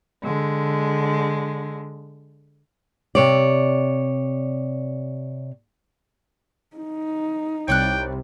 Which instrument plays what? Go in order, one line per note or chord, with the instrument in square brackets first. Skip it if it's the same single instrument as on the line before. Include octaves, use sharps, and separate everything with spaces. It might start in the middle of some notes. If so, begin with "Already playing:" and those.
[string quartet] D3 G#3
[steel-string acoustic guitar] C3 C#5 D5
[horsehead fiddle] D#4
[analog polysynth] C2 C3 G3 [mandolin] C#5 D5 F#6 [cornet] G5